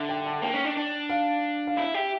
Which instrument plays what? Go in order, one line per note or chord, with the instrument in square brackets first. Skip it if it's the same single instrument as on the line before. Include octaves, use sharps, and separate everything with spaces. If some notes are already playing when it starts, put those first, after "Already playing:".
Already playing: [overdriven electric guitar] D3 [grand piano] E5
[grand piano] G5
A5
[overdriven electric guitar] A#3 [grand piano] G5
[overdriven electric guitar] C#4
D4
D4
[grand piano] F5
F5
[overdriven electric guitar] E4 [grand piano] E5
[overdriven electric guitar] G4